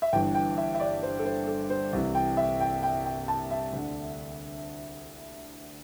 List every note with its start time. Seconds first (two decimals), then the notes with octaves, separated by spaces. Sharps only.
0.02 E5
0.13 G1 G2 E3 G5
0.35 G5
0.57 E5
0.75 E5
0.80 D5
1.03 C5
1.19 A4
1.25 C5
1.47 A4
1.70 C5
1.93 C2 C3 E3
2.15 G5
2.37 E5
2.60 G5
2.83 G5
3.05 G5
3.28 A5
3.51 E5
3.73 D2 D3